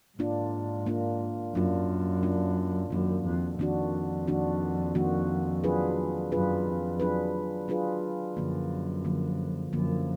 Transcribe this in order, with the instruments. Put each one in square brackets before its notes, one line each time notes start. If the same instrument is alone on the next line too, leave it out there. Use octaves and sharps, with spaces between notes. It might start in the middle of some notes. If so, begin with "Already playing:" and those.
[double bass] G#2 [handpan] A#3 D4 F4
[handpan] A#3 D4 F4
[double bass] F#2 [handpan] A#3 D4 F4
[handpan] A#3 D4 F4
[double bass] F#2 [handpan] D#3 A#3 D4 F#4
[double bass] F2
[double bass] F2 [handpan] D#3 A#3 D4 F#4
[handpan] D#3 A#3 D4 F#4
D#3 A#3 D4 F#4
F#3 D4 F4 G#4 B4
[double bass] F#2 [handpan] F#3 D4 F4 G#4 B4
[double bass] F2
[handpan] F#3 D4 F4 G#4 B4
F#3 D4 F4 G#4 B4
[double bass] F#2 [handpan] D3 F3 A#3
[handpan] D3 F3 A#3
[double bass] F#2 [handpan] D3 F3 A#3